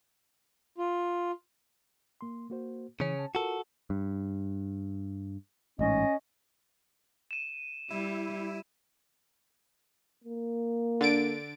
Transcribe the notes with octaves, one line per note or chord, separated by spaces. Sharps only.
F4
A#3 C6
A#3 F#4 C5
C#3 E3 C#4
A5
F4 F#4 A4 A#4
G2
A1 G#2 C#4 D#5
D#7 E7
G3 E4
A#3
D3 A6 D7